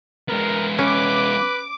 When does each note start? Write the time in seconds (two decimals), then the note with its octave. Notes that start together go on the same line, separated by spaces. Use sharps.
0.29 G#3 B3 A#4
0.79 C#4 B4 D6